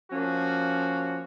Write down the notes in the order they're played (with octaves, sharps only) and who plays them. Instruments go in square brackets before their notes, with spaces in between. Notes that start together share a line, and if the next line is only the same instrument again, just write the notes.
[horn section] F3 A#3 C#4 F#4